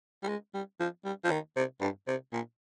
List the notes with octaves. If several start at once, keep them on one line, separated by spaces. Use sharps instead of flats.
G3
G#3
G3
F3
G3
F3
D#3
C3
G2
C3
A#2